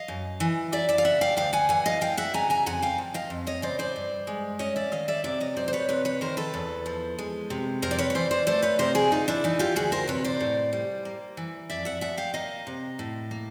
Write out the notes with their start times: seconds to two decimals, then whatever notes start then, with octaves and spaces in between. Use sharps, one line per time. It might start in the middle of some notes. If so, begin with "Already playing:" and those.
Already playing: D#5 F5
0.08 F#2
0.40 E3
0.72 F#2 D5 E5
0.89 D5 E5
0.98 F5
1.05 C#3 E5 F#5
1.21 F5 G5
1.37 D2 F5 G5
1.53 F#5 G#5
1.69 E3 F#5 G#5
1.86 D#5 F5
2.01 D2 F5 G5
2.17 E5 F#5
2.34 C#3 G#5 A#5
2.50 G#5 A#5
2.66 F2 F#5 G#5
2.82 F5 G5
2.98 F3
3.14 D#5 F5
3.30 F2
3.47 C#5 D#5
3.62 C#3 C5 D5
3.79 C5 D5
3.96 G2
4.27 G#3
4.59 C#4 C#5 D#5
4.76 D5 E5
4.92 D#3 D#5 F5
5.08 D5 E5
5.24 C3 D5 E5
5.40 C#5 D#5
5.56 F#3 C5 D5
5.68 C5
5.73 B4 C#5
5.89 C3 B4 C#5
6.05 B4 C#5
6.21 D#3 A#4 C5
6.37 A4 B4
6.54 E2
6.86 F3
7.19 G#3
7.50 C3
7.82 F2 A#4 C5
7.91 D5
7.98 B4 C#5
8.10 C#5
8.15 E3 C5 D5
8.31 C5 D5
8.47 A3 C5 D5
8.62 B4 C#5
8.79 C3 A#4 C5
8.95 G#4 A#4
9.11 D2 D#4 F4
9.28 D4 E4
9.44 E3 D#4
9.59 F4 G4
9.76 D2 F#4 G#4
9.92 A#4 C5
10.08 C3 B4 C#5
10.24 C5 D5
10.40 A2
10.73 G3
11.05 A#3
11.37 E3
11.70 F2 D5 E5
11.85 E5 F#5
12.01 F3 E5 F#5
12.17 F5 G5
12.34 A#3 D#5 F5
12.67 C3
12.99 A2
13.31 A#3